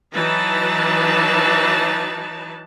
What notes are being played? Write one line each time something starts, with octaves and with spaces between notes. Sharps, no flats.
E3 F#3 D#4 B4 A5